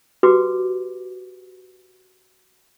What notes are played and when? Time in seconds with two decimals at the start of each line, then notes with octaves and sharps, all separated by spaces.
0.23 F#4 G4 B4 D6